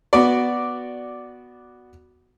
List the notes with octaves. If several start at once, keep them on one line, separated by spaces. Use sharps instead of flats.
B3 F#4 D5